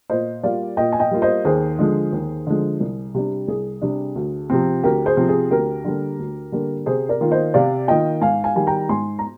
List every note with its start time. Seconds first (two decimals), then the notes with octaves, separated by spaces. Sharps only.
0.10 A#2 C5 D#5
0.43 G3 A#3 F4 D5 F5
0.77 A#2 D#5 G5
0.92 G#5
0.99 D#5 G5
1.11 G3 A#3 F4
1.22 C5 D#5
1.45 D#2 G#4 C5
1.79 D3 F3 G#3
2.12 D#2
2.47 D3 F3 G#3
2.80 C2
3.14 C3 G3 D4
3.48 C2 G#4
3.82 C3 G3 D4
4.16 D2
4.50 C3 F3 C4
4.83 D2 G4 A#4
5.06 G#4 C5
5.17 C3 F3 C4
5.28 G#4
5.50 D2 G4 A#4
5.85 D3 G3 A#3
6.19 D2
6.52 D3 G3 A#3
6.86 C3 G#4 C5
7.09 A#4 D5
7.21 D#3 A#3 F4
7.31 C5 D#5
7.54 C3 D5 F5
7.88 D#3 A#3 F4 D#5 G5
8.21 G#2 F5 G#5
8.44 F5 G#5
8.55 D#3 G3 G#5
8.67 G5 A#5
8.89 G#2 G#5 C6
9.19 A#5